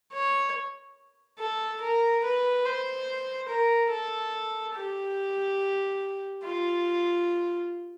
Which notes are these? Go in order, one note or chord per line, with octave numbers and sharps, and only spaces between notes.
C#5
A4
A#4
B4
C5
A#4
A4
G4
F4